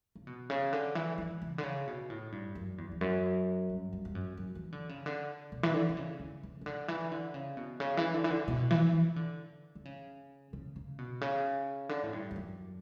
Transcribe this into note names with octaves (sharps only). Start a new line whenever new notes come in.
C#3
B2
C#3
D3
E3
E3
C#3
D3
C#3
B2
A2
G2
F#2
E2
E2
F#2
G2
G2
G2
F#2
F#2
E3
D3
C#3
D3
B2
E3
D3
D3
C#3
C#3
C#3
C#3
D3
E3
D3
C#3
B2
C#3
E3
D3
E3
D3
B2
E3
E3
D3
D3
C#3
C#3
C#3
B2
C#3
D3
A2
G2
E2
F#2